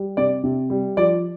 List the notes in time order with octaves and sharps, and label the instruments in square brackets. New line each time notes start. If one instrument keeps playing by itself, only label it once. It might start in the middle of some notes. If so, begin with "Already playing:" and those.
Already playing: [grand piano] G3
C3 D5
C3
G3
F3 D5